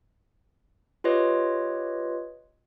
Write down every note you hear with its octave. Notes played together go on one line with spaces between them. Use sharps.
F4 G4 B4 C#5 D#5